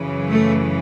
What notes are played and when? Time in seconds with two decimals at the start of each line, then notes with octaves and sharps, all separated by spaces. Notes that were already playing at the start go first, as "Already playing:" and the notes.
Already playing: F#2 C#3 E3
0.26 A3